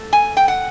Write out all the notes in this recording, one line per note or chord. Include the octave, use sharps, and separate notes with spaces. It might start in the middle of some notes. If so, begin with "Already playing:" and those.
Already playing: A3
G#5
G5
F#5